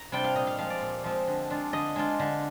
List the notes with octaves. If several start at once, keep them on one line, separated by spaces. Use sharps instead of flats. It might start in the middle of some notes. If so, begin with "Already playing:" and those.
Already playing: A#5
C3 G3 D4 F4 G5
F5
A#2 D#5
F5
F3 G#3 C4 F4 F5
D5
A#2
F3 G#3 C4 F4
D3
G#3 D4 F4
D3 D#5
G#3 D4 F4
D3